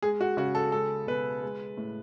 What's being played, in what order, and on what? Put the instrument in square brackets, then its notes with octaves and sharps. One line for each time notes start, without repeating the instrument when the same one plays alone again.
[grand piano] G#3 G#4
F#4
C#3 F#4
A4
G#3 A4
B2 B4
G#3
A2